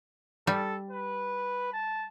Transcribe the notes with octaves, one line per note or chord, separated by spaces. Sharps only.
G3 A4
B4
A5